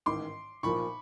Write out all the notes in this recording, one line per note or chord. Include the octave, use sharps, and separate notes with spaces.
A1 G#2 D#3 C6 D6
B1 A#2 F3 A#3 B5 C#6